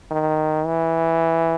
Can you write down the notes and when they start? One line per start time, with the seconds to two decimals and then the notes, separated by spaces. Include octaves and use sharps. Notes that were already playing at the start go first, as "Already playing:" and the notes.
0.11 D#3
0.66 E3